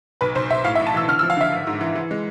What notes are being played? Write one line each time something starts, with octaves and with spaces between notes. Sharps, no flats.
B1 B4
B1 C5
B1 E5
A2 F5
E5
A1
A5
E3 E6
D3 F6
E6
F3
F5
D3 E5
G#1
G#2
E3
E3
G#3